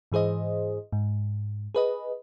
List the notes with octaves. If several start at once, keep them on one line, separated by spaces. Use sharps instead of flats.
G#2 E3 G#4 C5 D#5
G#2
G#4 B4 D#5